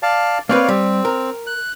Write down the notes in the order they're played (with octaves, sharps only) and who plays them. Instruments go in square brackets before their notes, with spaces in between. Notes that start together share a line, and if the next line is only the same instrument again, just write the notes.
[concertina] D5 F5 A5
[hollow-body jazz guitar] A#3 C4 B4 [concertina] C#5 D5 F5
[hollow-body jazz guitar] G3 [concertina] C4
[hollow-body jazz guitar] A#4
[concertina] F#6